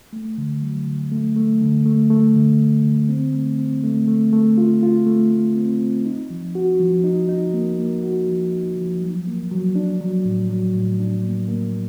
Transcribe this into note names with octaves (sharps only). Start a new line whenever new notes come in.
A3
D3
F#3
D3
A3
A3
D3
A3
A3
D3
D3
D3
C4
A3
C4
A3
A3
A3
F4
F4
A3
A3
C4
C4
D#4
F3
F#4
F3
D#4
D#4
A#3
A#3
F#4
F3
D#4
F3
F#3
A#3
F#3
D4
F#3
A2
F#3
A2
D4
A#3
A#3